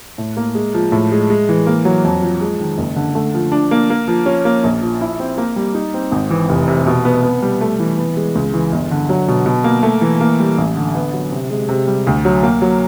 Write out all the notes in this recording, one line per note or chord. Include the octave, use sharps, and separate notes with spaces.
A2
A#3
G#3
F3
A2
G#3
G#3
E3
A#3
F#3
F2
F3
G#3
D#3
F#1
D3
A3
F3
D4
A#3
A#3
F3
C#4
A#3
A#1
F3
E4
C4
A#3
G3
D#4
C4
G#1
E3
F1
C3
B2
B3
B3
G3
A3
E3
B3
G#3
C#2
E3
G1
D3
F#3
B2
B2
A#3
A3
E3
A#3
G3
A1
D3
B3
F#3
C3
G#3
C3
G3
D2
F#3
A#3
F#3